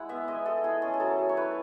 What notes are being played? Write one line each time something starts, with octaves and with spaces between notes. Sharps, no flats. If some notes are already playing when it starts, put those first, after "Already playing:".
Already playing: G#3 E4 F#5
B3 E5
G#3 D#5
G#3 A4
E4 G#4
C#4 A4
G#4
F#3 A4
F#3
C#5
E4 B4